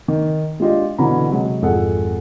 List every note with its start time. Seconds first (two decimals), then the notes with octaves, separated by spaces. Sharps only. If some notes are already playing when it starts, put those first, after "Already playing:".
0.08 D#3
0.60 G#3 D4 F4 G4 D#5
0.98 B2 D3 E3 C#4 A#5 B5
1.29 C3 F#3 G#3
1.62 G#1 F2 G#4 A4 F#5